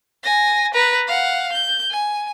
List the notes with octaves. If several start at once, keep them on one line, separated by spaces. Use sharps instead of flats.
G#5 A#6
B4 A#5
F5 F#5
G6
G#5